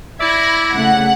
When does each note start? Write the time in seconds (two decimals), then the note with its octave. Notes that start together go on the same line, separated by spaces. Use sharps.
0.20 E4 D5 E5 B5 G#6 A#6
0.73 C#3 A3 F#5